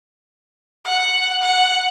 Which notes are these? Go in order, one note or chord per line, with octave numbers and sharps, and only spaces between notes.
F#5
F#5